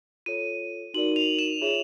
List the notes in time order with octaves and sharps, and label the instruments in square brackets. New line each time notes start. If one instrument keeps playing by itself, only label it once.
[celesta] F4 A4 C#5 [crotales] D#7
[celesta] D#4 F#4 A#4 D5 [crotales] F#7
[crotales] F7
E7
[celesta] F4 G#4 C#5 E5